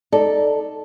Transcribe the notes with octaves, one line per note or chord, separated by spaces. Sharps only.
D#4 A4 D5